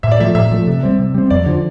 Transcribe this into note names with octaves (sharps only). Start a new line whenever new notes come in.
A2 E5
D5
F3 A3 E5
A2 E5
F3 A3
C3
G3 C4
C3
G3 C4
F2 D5
D3 F3